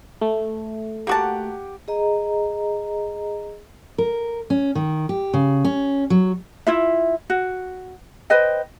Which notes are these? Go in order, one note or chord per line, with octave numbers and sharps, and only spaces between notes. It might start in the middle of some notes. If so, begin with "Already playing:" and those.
A3
A#3 F#4 G4 F#5 A5 D6
G#4 D#5 A#5
A#4
C#4
D#3
G4
C#3
C#4
F#3
E4 F4 E5
F#4
B4 C5 D#5 G5